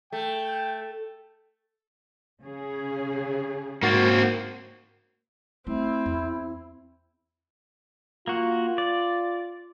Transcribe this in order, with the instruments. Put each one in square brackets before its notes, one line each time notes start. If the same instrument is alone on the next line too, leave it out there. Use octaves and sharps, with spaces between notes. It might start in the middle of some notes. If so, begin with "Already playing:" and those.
[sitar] A3 [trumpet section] G5
[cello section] C#3 C#4 G#4
[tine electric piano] G#2 F#4 A6 [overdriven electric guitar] A#3 C4
[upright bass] A3 [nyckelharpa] C4 [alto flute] E4
[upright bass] E2
[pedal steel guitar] A#3 F#4 [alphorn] F4
[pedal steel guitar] D5